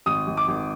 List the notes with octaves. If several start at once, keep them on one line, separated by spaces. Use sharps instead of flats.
G#1 D#6
G#1
D6
G#1